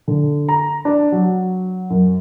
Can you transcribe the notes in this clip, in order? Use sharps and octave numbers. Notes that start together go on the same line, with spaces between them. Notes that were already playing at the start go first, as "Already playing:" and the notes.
D3
A#5
D4
F#3
F#2